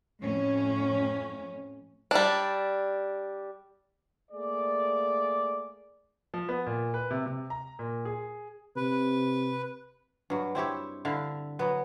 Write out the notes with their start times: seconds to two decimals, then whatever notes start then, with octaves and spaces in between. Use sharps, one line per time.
0.23 F2 A2 C#4
2.11 G3 D4
4.31 A3 A#3 G#4 D5
6.34 F3
6.49 B3
6.66 A#2
6.94 B4
7.11 C3
7.26 C3
7.50 A#5
7.79 A#2
8.05 G#4
8.76 C3 B4
10.30 G2 F#3
10.55 C4 E4 G4 C#5
11.05 D3 E4 F5
11.59 F#3 B3